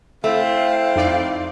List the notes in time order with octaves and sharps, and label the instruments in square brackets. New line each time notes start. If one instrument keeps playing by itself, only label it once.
[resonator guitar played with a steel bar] A3 [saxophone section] C4 E4 [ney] F5
[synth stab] F2 D#4 D5